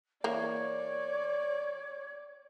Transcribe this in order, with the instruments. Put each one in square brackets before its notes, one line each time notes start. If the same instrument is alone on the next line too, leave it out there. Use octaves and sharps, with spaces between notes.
[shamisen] E3 A#3 [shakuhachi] C#5 [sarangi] D5